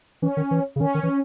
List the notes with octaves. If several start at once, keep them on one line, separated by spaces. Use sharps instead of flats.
E3 C#4
D#3
E3
C#3
D#3 C#4
D#3
E3